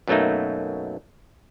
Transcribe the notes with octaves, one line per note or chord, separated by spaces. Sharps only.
F#2 B2 F#3 A3 A#3 D#4